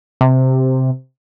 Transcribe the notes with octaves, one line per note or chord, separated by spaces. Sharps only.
C3